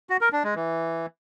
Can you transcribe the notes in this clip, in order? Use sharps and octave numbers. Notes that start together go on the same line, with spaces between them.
F#4
A#4
D4
G#3
E3